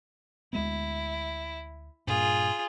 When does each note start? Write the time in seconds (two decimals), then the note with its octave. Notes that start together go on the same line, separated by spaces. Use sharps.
0.53 D2 G#3 B3 E4
2.07 G2 A#2 F4 G#4